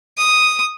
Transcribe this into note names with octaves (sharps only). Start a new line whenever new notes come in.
D#6